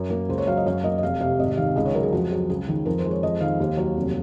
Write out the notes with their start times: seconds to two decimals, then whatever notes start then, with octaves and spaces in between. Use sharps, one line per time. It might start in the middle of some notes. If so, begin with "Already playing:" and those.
Already playing: F#2 A#4
0.10 A#3
0.29 C#2 C5
0.38 C#5
0.47 F#3 F5
0.57 D#5
0.66 F#2 F5
0.84 A#3 D#5
0.98 D#5
1.03 F1 F5
1.21 C3 F5
1.39 G#1 D#5
1.57 D#3 F5
1.76 C#2 D#5
1.86 C#5
1.94 F#3 A#4
2.03 G#4
2.12 F2 F#4
2.31 F#3 G#4
2.50 C#2 G#4
2.68 D#3
2.86 F2 A#4
2.99 C5
3.05 G#3
3.11 C#5
3.23 F2 D#5
3.41 D#3 F5
3.60 D#2
3.77 F#3
3.97 F1